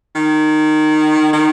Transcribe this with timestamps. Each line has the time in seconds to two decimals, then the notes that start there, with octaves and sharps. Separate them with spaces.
0.15 D#3
1.33 D#3